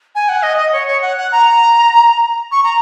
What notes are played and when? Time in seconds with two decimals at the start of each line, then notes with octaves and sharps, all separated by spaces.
0.15 G#5
0.29 F#5
0.43 D#5
0.58 D#5
0.73 C#5
0.87 C#5
1.02 F#5
1.17 F#5
1.32 A#5
2.52 C#6
2.64 A#5